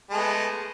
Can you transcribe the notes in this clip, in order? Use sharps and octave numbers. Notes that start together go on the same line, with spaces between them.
G#3 A3 B3